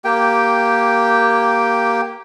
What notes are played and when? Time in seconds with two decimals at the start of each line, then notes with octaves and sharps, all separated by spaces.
0.04 A#3 G4 G5